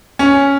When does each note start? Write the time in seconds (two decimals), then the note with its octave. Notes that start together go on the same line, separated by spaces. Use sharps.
0.19 C#4